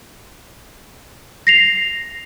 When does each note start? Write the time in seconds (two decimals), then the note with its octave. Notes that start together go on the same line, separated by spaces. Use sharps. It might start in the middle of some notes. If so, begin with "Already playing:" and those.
1.47 A#6 C7 F7